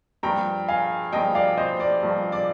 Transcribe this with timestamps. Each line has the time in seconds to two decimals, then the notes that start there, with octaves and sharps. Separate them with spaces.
0.23 G2 F3 G5 A#5
0.68 F5 G#5
1.12 G2 F3 D#5 G5
1.35 D5 F5
1.58 C5 D#5
1.80 D5
2.03 G2 F3
2.32 D5